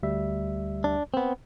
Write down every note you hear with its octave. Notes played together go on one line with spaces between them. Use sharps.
D2 G3 E5
D4
B3 C4